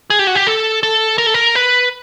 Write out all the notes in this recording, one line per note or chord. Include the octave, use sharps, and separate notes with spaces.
G#4
G4
F#4
G4
A4
A4
A#4
A4
A#4
B4